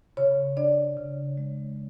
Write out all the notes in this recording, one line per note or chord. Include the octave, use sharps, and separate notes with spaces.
C#3 C#5
D4 D5
C#3
G#3